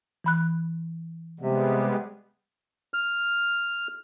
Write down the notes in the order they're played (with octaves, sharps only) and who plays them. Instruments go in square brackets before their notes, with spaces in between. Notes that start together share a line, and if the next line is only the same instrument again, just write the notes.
[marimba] E3 B5 F#6
[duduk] C3 [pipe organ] G3 G#3 B3
[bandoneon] F6